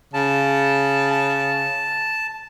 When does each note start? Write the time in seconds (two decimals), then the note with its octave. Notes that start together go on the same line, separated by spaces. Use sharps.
0.14 C#3 A5
1.11 A5